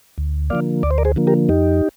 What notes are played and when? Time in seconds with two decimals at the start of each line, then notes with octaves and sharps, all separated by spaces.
0.18 D2
0.50 D3 F3 A#3 D5 F5
0.83 D2 D5
0.91 C5
0.98 A#4 D5
1.05 G#4 C5
1.16 D3 F3 A#3
1.27 G4 A#4
1.49 F2 D#4 G4